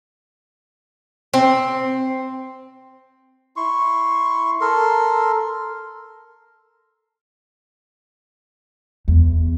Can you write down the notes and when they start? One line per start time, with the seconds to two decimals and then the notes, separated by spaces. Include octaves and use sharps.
1.34 C4
3.56 E4 C6 C#6
4.61 A4 A#4 C6
9.08 E2